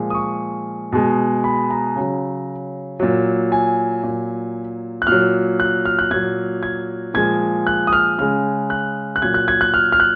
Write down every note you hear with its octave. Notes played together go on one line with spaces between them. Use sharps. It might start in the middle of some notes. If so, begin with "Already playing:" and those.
Already playing: A#2 F3 G#3
D#6
C#6
B2 G#3
B5
A#5
C#3 F#3
A#2 F#3
G#5
A#2 F#3
F#6
A#2 F#3 F6
F#6
F6
F#6
A#2 F#3 G#6
G#6
A#2 F3 G#3 G#6
F#6
D#6
F6
C#3 G#3 F6
F#6
F#6
A#2 F#3 G#6
F#6
G#6
F#6
F6
F6
F#6